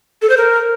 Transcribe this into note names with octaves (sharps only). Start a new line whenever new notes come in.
A4
C5
A#4